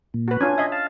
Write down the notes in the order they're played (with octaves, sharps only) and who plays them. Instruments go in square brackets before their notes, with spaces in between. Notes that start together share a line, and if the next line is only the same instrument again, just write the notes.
[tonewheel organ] A#2
[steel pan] F#4 B4
[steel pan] C#4 D4 F4 [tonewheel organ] G#5
[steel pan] D#5 E5
[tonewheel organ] F5 A5